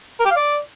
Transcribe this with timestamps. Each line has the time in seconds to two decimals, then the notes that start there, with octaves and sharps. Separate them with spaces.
0.20 A#4
0.25 G4
0.31 F5
0.36 D5